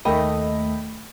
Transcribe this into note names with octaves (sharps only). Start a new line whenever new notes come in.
D#2 A3 A#4 D#5 G5 B5